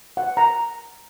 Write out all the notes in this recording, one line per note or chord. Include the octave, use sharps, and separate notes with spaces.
F#5
A#5